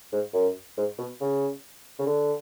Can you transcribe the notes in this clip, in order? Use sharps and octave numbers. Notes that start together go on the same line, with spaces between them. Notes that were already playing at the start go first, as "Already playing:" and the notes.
G#2
F#2
G#2
B2
C#3
C#3
D3